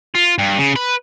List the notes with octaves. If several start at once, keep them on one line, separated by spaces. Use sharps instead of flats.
F4
G2
C#3
B4